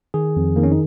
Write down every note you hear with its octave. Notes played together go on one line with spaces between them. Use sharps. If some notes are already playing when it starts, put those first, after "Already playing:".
D#3 G#4
F2
D#3 A#3
C#4
D#4